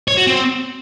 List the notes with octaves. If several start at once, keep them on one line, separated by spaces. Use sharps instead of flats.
C#5
F#4
C4